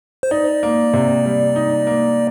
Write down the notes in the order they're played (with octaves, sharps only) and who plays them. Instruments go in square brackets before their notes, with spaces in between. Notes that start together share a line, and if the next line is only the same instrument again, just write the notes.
[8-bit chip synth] C5
[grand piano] D#4 [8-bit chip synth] D5
[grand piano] A#3
C3
G3
D#4
A#3